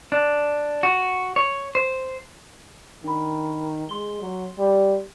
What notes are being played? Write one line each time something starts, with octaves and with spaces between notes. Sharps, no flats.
D4
F#4
C#5
C5
D#3 D4 B5
G#3 C6 G7
F#3
G3